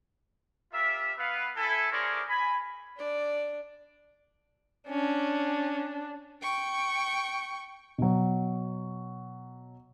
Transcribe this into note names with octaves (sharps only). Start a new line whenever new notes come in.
F4 G4 A#4 E5
B3 B4 F5
E4 A4 G#5
C#4 E4 G#4 A#4 C5 D5
G#5 B5
D4 D5
C#4 D4
G5 C#6
B2 F#3